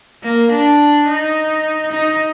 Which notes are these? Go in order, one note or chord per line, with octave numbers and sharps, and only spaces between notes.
A#3
D4
D#4
D#4